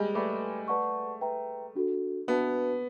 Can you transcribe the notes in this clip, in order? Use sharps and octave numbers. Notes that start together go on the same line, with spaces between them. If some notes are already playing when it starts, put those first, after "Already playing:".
Already playing: G3 G#3
A3 B4 D5 G5 B5 D6
B4 D5 F#5 A5 C#6
B4 E5 G5 A#5
D4 F#4 A4
B3 D4 F#4 B4 E5 A5